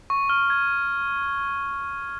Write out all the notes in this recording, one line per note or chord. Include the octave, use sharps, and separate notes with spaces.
C#6
F6
G#6